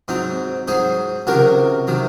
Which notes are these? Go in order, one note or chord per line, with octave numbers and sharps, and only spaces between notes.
G#2 F#3 C4 D#4
G#2 F#3 G#4 C5
C#2 C3 D#3 F#3 F#4 A#4
C3 D#3 F#3